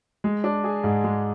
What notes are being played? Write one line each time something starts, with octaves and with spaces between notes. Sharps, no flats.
G#3
D4
G#4
G#2
G#3